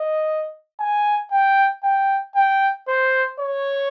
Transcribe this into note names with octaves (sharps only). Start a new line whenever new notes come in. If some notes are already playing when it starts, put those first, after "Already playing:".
Already playing: D#5
G#5
G5
G5
G5
C5
C#5